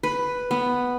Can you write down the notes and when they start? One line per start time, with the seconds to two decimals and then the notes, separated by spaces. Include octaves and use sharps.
0.03 B4
0.51 B3